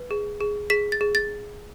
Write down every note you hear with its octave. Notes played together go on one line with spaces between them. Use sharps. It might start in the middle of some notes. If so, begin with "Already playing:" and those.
Already playing: B4
G#4
G#4
G#4 B6
A6
G#4
A6